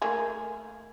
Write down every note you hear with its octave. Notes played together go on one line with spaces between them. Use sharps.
A3 A#3 G#4